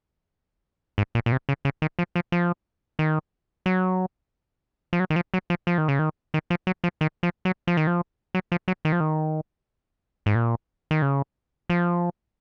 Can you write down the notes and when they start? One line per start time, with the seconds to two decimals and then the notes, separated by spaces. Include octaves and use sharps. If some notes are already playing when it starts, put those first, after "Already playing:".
0.98 G#2
1.15 A#2
1.26 A#2
1.32 C3
1.49 C#3
1.65 C#3
1.82 D#3
1.99 F3
2.16 F3
2.32 F3
2.99 D#3
3.66 F#3
4.93 F3
5.00 F#3
5.10 D#3
5.16 F3
5.34 F#3
5.50 F3
5.67 F3
5.78 D#3
5.88 C#3
5.99 D#3
6.34 D#3
6.50 F3
6.67 F#3
6.84 F3
7.01 D#3
7.23 F3
7.45 F#3
7.67 F3
7.77 D#3
7.87 F3
8.35 F#3
8.52 F3
8.68 F#3
8.85 D#3
8.92 F3
9.00 D#3
10.26 G#2
10.35 A#2
10.91 D#3
11.02 C#3
11.70 F3